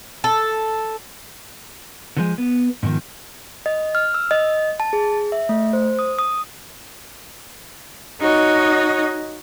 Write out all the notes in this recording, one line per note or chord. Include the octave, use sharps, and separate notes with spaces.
A4
D3 F3 G#3
B3
G#2 B2 D#3 F3
D#5
F6
E6
D#5
A5
G#4
E5
A3
C5
D#6
D#6
D#4 F#4 C#5 D#5